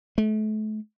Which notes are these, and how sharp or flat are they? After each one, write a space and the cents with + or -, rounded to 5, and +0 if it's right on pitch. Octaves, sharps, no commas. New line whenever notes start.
A3 -35